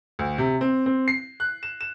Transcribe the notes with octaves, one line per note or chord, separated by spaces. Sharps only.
D2
C3
C4
C4
C7
F#6
E7
E7